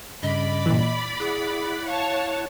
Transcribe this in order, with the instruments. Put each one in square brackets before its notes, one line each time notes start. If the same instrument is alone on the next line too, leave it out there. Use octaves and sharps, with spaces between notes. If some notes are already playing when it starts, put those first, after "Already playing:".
[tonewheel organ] G2 C#3 [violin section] D5 B5 [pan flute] D#5
[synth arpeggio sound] A#2 E3
[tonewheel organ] E4 F#5 [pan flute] G#4
[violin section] C#5 A5 [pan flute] F5